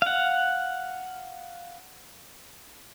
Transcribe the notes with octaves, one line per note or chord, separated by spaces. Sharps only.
F5 F#5